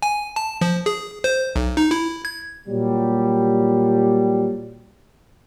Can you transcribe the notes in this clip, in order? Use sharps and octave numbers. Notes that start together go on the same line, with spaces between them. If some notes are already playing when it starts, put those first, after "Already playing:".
G#5
A5
F3
G#4
C5
B1
D#4
E4
G#6
A#2 F#3 G3